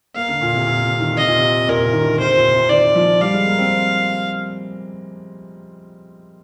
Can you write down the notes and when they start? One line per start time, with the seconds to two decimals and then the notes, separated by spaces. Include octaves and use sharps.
0.16 A#3 F5
0.29 D3
0.41 A#2
0.54 C3
0.66 A#2
0.84 C3
1.00 D#3
1.17 C3 D#5
1.27 A#2
1.38 C3
1.68 A#2 A#4
1.86 C3
1.93 D#3
2.02 D3
2.19 C3 C5
2.37 A#2
2.53 C3
2.69 D#3 D5
2.96 F3
3.20 G3 F5
3.34 G#3
3.46 A#3
3.59 C4